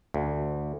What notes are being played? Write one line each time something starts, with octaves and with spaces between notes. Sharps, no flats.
D2